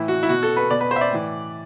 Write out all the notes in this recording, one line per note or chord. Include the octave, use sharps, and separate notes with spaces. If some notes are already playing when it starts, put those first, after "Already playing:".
Already playing: A2 E3 E4
F#4
E4
B2 F#4
A4
B4
B2 D5
B4
C5
E5
D5
A2 E3